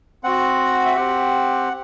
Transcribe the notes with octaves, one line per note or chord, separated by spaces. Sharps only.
C4 F#4 F#5
E5
C4 G4 F#5